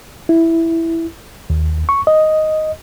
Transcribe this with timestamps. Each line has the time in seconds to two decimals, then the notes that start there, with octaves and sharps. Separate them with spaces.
0.29 E4
1.50 D#2
1.89 C#6
2.07 D#5